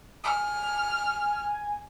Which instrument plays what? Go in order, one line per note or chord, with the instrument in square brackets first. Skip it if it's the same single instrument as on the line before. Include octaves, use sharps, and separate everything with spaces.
[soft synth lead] G#5 [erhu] F6